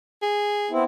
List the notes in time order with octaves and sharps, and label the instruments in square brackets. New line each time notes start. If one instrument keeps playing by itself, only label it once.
[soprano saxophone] G#4
[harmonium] B3 C4 E4